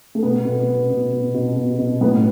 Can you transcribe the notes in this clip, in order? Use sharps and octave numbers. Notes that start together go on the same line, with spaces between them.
A3
B2 B3
B2
B2
B2
B2
B2
B2
B2
A2 B3